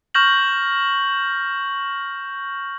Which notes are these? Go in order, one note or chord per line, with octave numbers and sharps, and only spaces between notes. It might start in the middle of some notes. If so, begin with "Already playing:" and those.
C#6 F6 G6 A#6 F#7